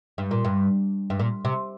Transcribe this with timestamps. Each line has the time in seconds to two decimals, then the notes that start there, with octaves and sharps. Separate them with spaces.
0.18 G2
0.31 A#2
0.45 G2
1.10 G2
1.20 A#2
1.45 C3